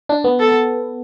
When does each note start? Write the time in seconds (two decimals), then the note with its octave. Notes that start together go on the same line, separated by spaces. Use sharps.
0.09 D4
0.24 B3
0.40 A4